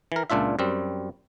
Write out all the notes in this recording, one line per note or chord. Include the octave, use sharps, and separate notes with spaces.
E3 A#4
C#2 A#2 D4 F4 E5
F#2 G3 C4